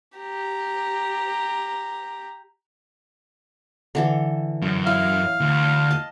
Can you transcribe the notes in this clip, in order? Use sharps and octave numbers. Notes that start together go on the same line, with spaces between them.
G4 A#5
D3 E3 A4
F#2
E4 F5
D2
D#5 A5